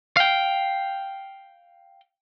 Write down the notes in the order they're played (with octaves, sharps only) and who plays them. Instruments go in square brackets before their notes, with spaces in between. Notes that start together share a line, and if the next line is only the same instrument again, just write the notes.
[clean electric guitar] F5 G5